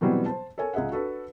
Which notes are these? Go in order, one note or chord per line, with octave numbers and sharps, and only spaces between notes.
B2 E3 F#3 G3 B3 C4
C5 A5
A4 A#4 C#5 G#5
C#2 G#4 D#5 E5 F#5
D4 F#4 A4 B4